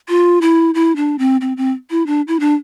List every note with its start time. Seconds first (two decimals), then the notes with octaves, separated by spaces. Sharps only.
0.09 F4
0.42 E4
0.75 E4
0.96 D4
1.19 C4
1.41 C4
1.57 C4
1.90 E4
2.07 D4
2.28 E4
2.40 D4